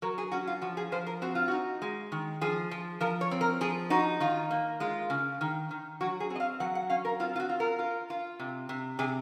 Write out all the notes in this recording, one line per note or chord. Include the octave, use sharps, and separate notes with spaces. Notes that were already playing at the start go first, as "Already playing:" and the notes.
F#3 A#4
G#4
C#4 F#4
F4
F3 F#4
G#4
F3 C5
A#4
C4 F#4
F4
D#4 F#4
G#3
D#3
F3 G#4
F3
F3 A#4
C#5
C4
A#4
F3 G#4
D#4 F#4
D#3 F4
A#3
G#3 F4
C#3
D#3
D#3
F#3 F#4
G#4
C4
D#5
F5
F#3 F#5
F#5
C#4 F5
A#4
C4 F4
F4
F#4
F4
A#4
F4
F4
C3
C3
C3 G#4